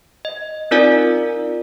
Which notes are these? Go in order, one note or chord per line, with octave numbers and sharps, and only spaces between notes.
D#5
C4 D#4 F4 A#4 D5 G#5